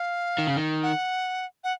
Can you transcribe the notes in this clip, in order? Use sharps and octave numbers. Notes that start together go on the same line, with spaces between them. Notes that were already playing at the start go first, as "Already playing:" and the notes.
Already playing: F5
D#3
C#3
D#3
F#5
F#5